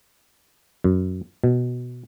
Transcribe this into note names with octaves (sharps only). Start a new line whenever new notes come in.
F#2
B2